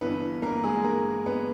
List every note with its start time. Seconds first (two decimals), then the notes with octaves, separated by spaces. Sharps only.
0.01 G1 G2 E3 B3 B4
0.42 A#3 A#4
0.64 G#3 G#4
0.84 A#3 A#4
1.26 B3 B4